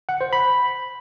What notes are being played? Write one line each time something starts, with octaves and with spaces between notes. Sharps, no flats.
F#5
C5
B5